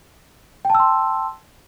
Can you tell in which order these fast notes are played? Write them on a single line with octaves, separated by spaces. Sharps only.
G5 A5 E6 C6